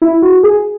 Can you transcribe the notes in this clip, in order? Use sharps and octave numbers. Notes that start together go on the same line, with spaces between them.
E4
F#4
G#4